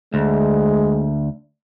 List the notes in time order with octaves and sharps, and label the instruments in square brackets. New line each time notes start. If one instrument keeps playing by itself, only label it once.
[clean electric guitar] D2 [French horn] G#3